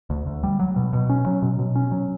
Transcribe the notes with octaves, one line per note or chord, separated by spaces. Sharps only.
D2
D2
G3
F#3
B2
B2
C#4
F#3
B2
B2
C#4
F#3